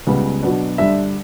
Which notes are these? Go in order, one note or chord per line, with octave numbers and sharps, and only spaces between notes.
C#2 C#3 G3 B3
B2 F#3 B3 D4
G2 D3 G3 D4 E5